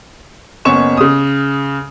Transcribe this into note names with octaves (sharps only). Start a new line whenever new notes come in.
F#1 B3 C#4 C#5 C#6 E7
C#3 D#6